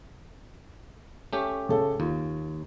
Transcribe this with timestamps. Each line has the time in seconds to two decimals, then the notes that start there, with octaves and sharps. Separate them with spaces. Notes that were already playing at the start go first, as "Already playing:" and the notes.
1.33 A3 C#4 G4
1.69 C#3 A4
2.00 D#2 F4